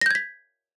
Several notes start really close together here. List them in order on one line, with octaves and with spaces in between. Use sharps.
A#6 G6 G#6 B6